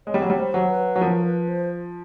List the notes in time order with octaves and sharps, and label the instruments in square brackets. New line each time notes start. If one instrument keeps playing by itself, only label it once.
[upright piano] G#3 [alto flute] C#5
[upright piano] G3
F#3
G3
[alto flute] C5
[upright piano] F#3
[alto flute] B4
[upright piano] F#3
[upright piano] F3 [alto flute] A#4
[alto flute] B4
C5